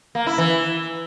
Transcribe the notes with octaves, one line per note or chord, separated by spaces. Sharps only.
A#3
E4
E3